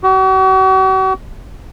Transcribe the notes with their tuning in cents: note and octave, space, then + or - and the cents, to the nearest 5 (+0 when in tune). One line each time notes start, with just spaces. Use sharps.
F#4 +40